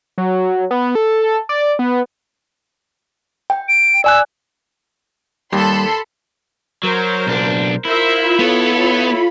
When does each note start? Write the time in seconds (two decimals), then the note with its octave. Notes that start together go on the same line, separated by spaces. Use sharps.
0.18 F#3
0.71 B3
0.95 A4
1.49 D5
1.79 B3
3.50 G5
3.68 D7
4.04 D5 G#5 E6 F#6
5.53 D#2 G3 A4 B5 C6
6.83 F#3 A#4 C5
7.27 B1 D4
7.85 E4 F4 A#4 C5 E5 B5
8.39 B3 A4 C#5